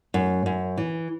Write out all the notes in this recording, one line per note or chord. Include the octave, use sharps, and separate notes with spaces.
F#2
F#2
E3